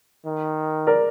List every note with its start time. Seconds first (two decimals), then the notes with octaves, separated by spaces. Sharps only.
0.25 D#3
0.87 A#4 D5